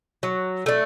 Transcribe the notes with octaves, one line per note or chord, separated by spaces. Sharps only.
F#3
A3 D4